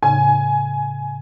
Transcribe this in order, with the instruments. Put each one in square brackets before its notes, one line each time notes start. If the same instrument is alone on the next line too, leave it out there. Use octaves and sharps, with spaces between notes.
[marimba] A2 C#3 [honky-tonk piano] G#5